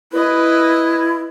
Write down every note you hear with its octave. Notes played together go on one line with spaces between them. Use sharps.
E4 B4 D#5